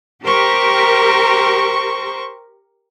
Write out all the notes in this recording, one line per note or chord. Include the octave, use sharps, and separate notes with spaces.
G4 A#4 C5 C#6